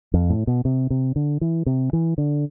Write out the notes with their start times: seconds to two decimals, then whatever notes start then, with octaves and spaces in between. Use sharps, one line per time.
0.14 F2
0.30 A2
0.47 B2
0.65 C3
0.90 C3
1.16 D3
1.41 E3
1.66 C3
1.93 E3
2.18 D3